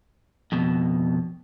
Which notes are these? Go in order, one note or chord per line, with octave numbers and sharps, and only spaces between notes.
F2 B2